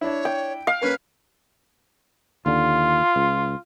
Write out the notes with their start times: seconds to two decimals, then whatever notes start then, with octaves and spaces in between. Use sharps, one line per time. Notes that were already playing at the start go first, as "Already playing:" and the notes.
0.01 D4 E4 C#5
0.25 G5
0.67 F5
0.82 A#3 C#4 A#4 B4
2.46 D#2 D3 F4
3.16 C#2